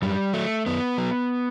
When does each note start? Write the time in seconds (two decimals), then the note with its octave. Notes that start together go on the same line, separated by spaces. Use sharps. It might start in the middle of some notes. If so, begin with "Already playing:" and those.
0.02 F#2 G3
0.33 F#3 A3
0.66 F#2 B3
0.98 F#3